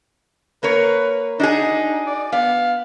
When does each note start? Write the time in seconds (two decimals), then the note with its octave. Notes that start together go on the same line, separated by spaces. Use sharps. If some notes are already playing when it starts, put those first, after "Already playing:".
0.63 A#3 A#4 B4 C#5
1.40 D4 D#4 F#4 G#4
2.07 D5
2.32 B3 F5